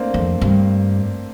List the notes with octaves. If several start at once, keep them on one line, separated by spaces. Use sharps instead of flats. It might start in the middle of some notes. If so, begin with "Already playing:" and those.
Already playing: A3 A#3 C4 D4
F2
G2